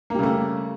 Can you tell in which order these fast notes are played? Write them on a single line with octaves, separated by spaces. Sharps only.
A#3 G3 C#3 A3